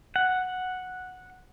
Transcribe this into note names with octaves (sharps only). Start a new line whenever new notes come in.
F#5